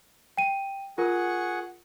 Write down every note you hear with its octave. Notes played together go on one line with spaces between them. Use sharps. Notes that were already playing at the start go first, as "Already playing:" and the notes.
G5 D#7
F4 G#4 A#4 F#5 C#6